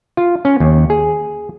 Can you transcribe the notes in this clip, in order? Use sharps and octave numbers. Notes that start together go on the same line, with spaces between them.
F4
C#4
D#2
G#4